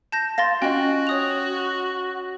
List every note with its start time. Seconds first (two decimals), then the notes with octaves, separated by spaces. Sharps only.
0.12 A5 G6 A#6
0.38 F5 C6 A6 A#6
0.62 C#4 F4 F#4 D#5 G5
1.07 C#5 D#6 F7